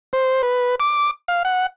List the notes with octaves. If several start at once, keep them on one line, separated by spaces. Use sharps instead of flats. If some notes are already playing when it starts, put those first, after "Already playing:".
C5
B4
D6
F5
F#5